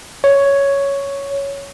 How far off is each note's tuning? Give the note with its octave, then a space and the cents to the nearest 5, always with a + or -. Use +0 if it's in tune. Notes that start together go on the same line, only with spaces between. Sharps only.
C#5 +5